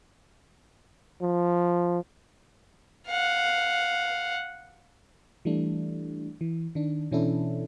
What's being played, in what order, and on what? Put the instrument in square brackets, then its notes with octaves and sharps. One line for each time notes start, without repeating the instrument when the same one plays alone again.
[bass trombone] F3
[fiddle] F5 F#5
[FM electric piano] E3 G3 A3 D4
E3
D#3 D4
B2 E3 C#4 D4 E4 A4